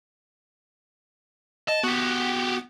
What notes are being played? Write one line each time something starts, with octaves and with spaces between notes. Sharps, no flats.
D#5 A5
B3 F#4 G4